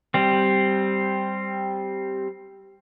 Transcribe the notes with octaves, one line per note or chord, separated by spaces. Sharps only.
G3 C4